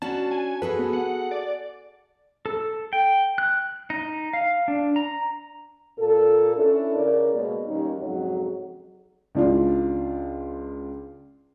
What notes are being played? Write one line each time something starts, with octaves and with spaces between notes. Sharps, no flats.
C#4 D4 F#4 A5
G#5
F#4 G#4 A4 B4
B3
F#5
D5
A4
G5
F#6
D#4
F5
D4
A#5
A#2 A4
C#4 D4 E4 A4
C#3 A#4 D5
B2 G#3 A#3 B3
D#2 G3 C#4 D#4
F2 G#2 C#3 F#3
C#2 D4 F4